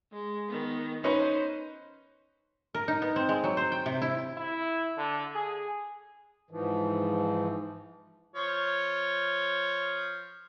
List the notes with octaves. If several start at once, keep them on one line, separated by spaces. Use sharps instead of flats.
G#3
D#3 B3
C#4 D#4 B4 C5
A#4
D#4
B3
C4
G#3
F#3
C5
G5
C3
E4
E4
D3
G#4
G#2 E3 F3
F3 C#5